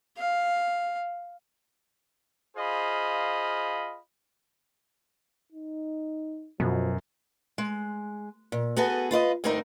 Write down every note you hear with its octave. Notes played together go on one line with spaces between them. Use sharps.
F5
F4 G#4 C5 D#5 F5 B5
D#4
F#2 B2 F3
G#3
A#2
B3 F#4 G#4 A4 B4
F4 B4 D5 D#5
D2 G2 A3 C4 D#4 A#4